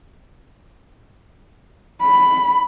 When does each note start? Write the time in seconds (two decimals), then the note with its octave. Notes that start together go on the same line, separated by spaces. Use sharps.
2.02 B5